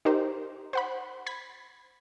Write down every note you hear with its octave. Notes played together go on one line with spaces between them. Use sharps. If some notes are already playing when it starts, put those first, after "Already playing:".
D#4 G4 A#4 C5
C5 F#5 B5
B5 G#6 B6